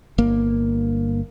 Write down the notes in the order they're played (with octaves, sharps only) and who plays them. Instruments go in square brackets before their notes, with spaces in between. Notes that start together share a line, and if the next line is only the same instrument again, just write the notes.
[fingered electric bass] G1 A#3